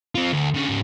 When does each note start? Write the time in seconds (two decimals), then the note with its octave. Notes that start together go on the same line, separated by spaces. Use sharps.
0.15 C4 F4
0.33 D2
0.54 D3 C#4
0.68 G#2 C#4